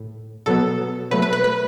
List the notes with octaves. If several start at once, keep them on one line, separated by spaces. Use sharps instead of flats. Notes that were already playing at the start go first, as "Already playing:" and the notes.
Already playing: A2
B2 F#3 B3 A4
B2 F#3 A3 B4
B4
B4
B4